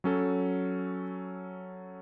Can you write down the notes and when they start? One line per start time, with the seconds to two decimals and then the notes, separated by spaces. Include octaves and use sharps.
0.04 F#3 C#4 A4